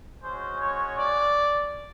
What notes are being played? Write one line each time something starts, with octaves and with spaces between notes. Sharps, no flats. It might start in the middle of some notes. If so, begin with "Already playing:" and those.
G#3 C#4 F#4 C5
C#5
D5